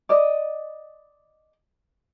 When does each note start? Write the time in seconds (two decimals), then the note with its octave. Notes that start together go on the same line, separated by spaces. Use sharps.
0.09 D5 D#5